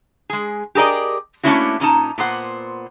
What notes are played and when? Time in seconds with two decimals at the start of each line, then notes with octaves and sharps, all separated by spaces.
0.30 G#3 G#4
0.75 G4 G#4 A#4 D5 D#5
1.43 A3 A#3 C#4 D4 E4 F#4
1.80 A#2 C#4 D#4 A5
2.18 A#2 B3 C5 F#5